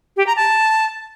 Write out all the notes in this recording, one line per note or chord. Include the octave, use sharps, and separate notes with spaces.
G4
A#5
A5